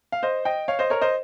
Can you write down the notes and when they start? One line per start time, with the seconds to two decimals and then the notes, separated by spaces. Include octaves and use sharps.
0.12 F5
0.23 C5 D#5
0.45 D#5 G5
0.68 C#5 F5
0.79 C5 D#5
0.90 A#4 C#5
1.01 C5 D#5